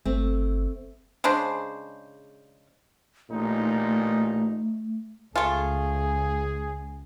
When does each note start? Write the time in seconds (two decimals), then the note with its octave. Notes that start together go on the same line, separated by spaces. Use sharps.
0.05 G1 A3 C4
1.24 C#3 G#3 D4 C5
3.31 A1 A#2 A3 D#4
5.36 C#2 A3 F4 G#4 G#5